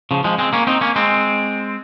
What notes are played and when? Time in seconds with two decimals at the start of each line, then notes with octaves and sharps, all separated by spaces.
0.11 C#3 F3
0.24 F3 G#3
0.39 G#3 C4
0.53 A#3 C#4
0.67 C4 D#4
0.81 A#3 C#4
0.96 G#3 C4